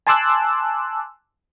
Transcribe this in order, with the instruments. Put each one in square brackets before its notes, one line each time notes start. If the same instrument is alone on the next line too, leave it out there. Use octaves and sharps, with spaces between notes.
[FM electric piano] G#5 A5 C6 D6 E6 F#6